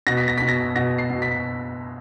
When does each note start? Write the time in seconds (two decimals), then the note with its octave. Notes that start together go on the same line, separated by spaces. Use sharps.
0.07 B2 A#6
0.17 B6
0.28 A#6
0.38 B2 B6
0.48 A#6
0.76 B2 A#6
0.98 C7
1.10 B2
1.22 B6